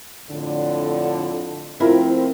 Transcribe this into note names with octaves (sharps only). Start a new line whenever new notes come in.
F2 A2 D3
F3 A3 C4 E4 F4 A#4